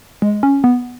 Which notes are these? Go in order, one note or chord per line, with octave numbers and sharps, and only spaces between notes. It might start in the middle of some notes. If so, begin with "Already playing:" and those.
G#3
C#4
B3